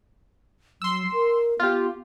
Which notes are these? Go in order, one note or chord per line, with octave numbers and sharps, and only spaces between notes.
F#3 C6 E6
A#4
B3 F4 G4